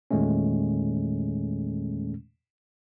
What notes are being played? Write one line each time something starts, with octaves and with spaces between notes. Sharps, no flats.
E2 A#2 D#3 G#3 A3 C#4